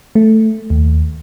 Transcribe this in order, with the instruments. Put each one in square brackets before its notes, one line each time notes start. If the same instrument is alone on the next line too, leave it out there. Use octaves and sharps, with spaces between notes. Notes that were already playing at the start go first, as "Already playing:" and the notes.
[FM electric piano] A3
D#2